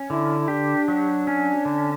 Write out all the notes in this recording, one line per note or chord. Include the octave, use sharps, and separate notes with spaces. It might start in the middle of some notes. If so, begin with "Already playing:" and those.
Already playing: C#4
D3 E4
E4
D4 G4
F#3
C#4
D3